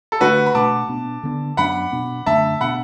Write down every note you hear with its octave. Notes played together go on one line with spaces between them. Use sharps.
A4
D3 A3 D4 F#4 B4
B5
B2 A3 D4 A5 D6
B2 B3 D4
D3 B3 D4
F#2 F#3 B3 D4 F#5 B5
B2 B3 D4
F#2 D3 A3 D4 E5 A5
B2 B3 D4 F#5 B5